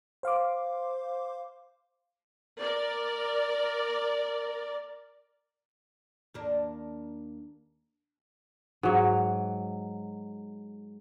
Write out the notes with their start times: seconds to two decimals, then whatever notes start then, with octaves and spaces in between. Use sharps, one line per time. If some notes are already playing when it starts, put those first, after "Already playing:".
0.23 C5 F5 C6 D6
2.60 A#4 D5
6.34 D#2 A#3 D4
8.83 G#2 F#3